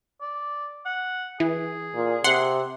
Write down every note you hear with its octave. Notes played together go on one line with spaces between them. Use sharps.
D5
F#5
E3 G#4
A#2
C3 F#5 C6